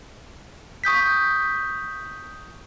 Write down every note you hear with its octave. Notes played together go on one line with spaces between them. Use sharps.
C#6 D#6 G6 B6